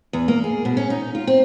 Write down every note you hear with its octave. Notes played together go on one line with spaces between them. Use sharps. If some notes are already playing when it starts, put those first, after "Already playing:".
E2
A#3
G#4
B2
C#4
D#4
F4
C4